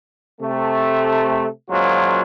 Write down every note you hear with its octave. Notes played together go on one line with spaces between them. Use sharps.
C3 A3
F#2 A#2 F#3 G#3 F4 C5